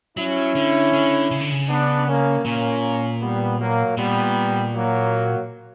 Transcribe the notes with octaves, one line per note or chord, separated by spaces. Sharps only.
F#3 C#4 E4
D3
D3
C#3
D3
C#3
B3 D4
A#3 C#4
A#2 A#3 C#4
G3 B3
F#3 A#3
A#2 G3 B3
F#3 A#3